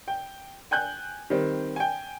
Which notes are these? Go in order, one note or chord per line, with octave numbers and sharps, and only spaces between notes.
G5
G5 G#5 F#6 G6
D#3 G3 C4
G5 G#5